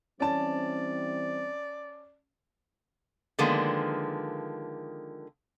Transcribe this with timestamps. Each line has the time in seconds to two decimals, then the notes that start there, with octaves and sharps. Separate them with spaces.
0.20 E3 G3 C4 C#4 D5 A5
3.39 D3 D#3 F3 G#3 A#3 B3